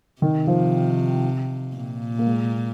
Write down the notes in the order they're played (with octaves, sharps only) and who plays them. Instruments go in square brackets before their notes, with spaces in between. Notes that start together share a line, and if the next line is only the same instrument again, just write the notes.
[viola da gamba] C3 [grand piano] D#3
[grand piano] F3
[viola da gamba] A#2
[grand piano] A#3
G#3